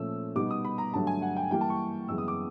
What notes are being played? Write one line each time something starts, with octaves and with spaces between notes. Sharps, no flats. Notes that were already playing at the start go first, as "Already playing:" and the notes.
Already playing: A#2 F3 A3 C#4 E6
B2 G3 B3 D#4 D6
D#6
B5
A#5
G2 D3 F#3 A3 A5
G#5
F#5
G5
E3 G3 A#3 G5
A5
C#6
F#2 C#3 E3 G#3 B3 E6
D#6
D6